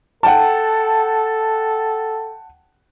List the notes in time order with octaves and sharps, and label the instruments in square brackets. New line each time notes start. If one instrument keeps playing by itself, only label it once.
[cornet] A4 [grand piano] F#5 G5 A5